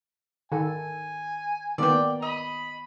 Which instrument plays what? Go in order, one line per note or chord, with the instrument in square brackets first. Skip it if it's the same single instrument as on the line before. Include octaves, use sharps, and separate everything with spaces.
[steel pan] D#3 A4 [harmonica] G#5
[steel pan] D#3 A#3 B3 [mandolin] D5 G5
[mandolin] D#5 [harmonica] B5